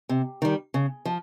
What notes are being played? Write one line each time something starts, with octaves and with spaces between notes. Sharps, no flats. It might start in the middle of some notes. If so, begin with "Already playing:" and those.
C3
D#3 G3
C#3
F3